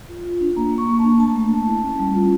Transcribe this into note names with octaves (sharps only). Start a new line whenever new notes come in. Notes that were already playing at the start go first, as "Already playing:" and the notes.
F4
F4
D4
A#3 A#5
A#3
C#6
A#3
A5
D4
A3 A5
A3
A3
E4
C#4
G3
F4